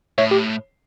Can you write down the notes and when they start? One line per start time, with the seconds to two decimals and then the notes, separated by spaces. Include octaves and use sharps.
0.18 A2 C#5 E5
0.31 G4